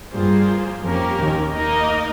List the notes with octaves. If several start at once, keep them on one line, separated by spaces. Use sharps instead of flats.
G2 F3 G3 A#3 F4 G#4 C5
F2 F3 A#3 C#4 G4 A#4
D#2 D#3
A#3 D#4 A#4 D#5